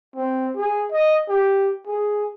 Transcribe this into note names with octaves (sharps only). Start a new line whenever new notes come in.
C4
G#4
D#5
G4
G#4